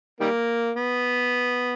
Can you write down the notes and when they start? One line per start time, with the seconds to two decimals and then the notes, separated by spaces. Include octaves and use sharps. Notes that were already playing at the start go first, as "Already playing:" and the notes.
0.20 D#3 G3 A#3
0.76 B3